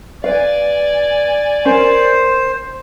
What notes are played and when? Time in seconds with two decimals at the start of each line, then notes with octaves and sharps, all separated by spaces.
0.24 B4 D5 F5 G#5
1.65 C#4 A#4 C5